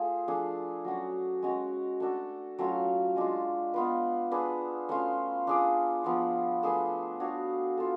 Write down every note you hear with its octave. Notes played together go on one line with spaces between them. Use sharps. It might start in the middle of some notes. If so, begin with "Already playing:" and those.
Already playing: A3 F4 G#4
F3 A3 D4 G#4
F#3 C#4 F#4
G#3 C#4 F#4
A3 D4 F#4 A4
F#3 A3 C#4 F4
G#3 D4 F4
B3 F4 B4
D4 G#4 B4
A3 C#4 F4
D4 F4 G#4 D5
F3 B3 F4
A3 D4 G#4 B4
D4 F#4 C#5 F5
F4 A4